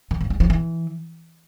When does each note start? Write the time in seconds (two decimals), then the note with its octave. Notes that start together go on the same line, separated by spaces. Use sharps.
0.11 D#3
0.21 G2
0.30 G3
0.40 F3
0.50 E3